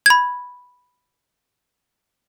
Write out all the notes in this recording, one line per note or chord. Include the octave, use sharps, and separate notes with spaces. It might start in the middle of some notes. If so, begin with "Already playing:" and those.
B5 G#6